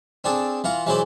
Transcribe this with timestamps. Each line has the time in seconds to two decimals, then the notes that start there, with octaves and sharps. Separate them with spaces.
0.24 C4 D4 G#4 A4
0.64 E3 F4 F#5 A#5
0.86 E3 F#3 G#3 E4 C5 D5